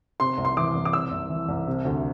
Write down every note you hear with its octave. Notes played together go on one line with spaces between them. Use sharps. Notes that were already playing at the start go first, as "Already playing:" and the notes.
C3 C6
C2
C6
E3 D6
C2
D6
C3 E6
C2
E3
C2
C3
D2